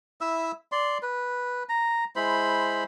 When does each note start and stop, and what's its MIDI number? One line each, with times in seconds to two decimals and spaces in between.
0.21 0.52 64
0.21 0.52 76
0.21 0.52 88
0.72 0.98 74
0.72 0.98 84
1.02 1.63 71
1.69 2.04 82
2.16 2.84 56
2.16 2.84 64
2.16 2.84 72
2.16 2.84 83